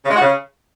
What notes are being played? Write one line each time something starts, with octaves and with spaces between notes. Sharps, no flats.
C#3
G#3
F#4
C#3